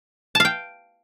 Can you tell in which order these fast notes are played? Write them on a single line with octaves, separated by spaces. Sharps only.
A5 F5 G5